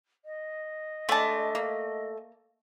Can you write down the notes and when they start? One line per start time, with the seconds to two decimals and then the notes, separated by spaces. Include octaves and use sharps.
0.24 D#5
1.09 G#3 A3 D4 A5
1.55 A#3